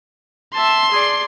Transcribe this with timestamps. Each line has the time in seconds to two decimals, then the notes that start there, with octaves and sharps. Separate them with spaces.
0.54 E5 A5 C6
0.91 G#4 D5